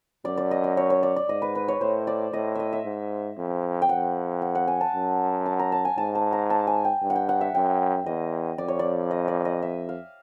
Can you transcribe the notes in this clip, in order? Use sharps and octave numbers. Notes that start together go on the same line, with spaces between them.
F#2 D5
D5
D#5
D5
C#5
C#5
D5
D5
G#2 D#5
B4
B4
C#5
A2 C5
D5
A2 D#5
D#5 E5
E5
G#2
F2
G5
F2 F#5
F#5
F#5
G#5
A5
F#2
A5
A#5
A5
G#5
G#2 A5
A5
A#5
A5
G#5
G5
G2
F#5
G5
F#5
E5
F#2 G5
E2 D#5
F2 D5
C#5
D5
D#5
D5
D#5
E5
F5